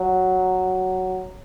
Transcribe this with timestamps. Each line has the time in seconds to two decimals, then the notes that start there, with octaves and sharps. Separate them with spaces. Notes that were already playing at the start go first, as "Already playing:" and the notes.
Already playing: F#3